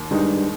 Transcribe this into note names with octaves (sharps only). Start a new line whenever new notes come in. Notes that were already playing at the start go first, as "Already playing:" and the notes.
Already playing: D#2
G2 D#3 G#3 D#4